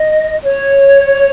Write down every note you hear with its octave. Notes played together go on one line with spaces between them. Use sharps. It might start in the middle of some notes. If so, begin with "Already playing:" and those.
Already playing: D#5
C#5